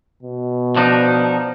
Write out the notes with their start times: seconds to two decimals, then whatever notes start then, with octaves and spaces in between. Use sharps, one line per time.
0.23 B2
0.76 F3 D4 D#4